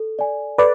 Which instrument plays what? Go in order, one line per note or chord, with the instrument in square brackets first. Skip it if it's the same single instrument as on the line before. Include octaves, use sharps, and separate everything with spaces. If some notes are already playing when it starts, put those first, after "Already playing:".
Already playing: [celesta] A4
D5 G#5
[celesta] A4 [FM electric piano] B4 D5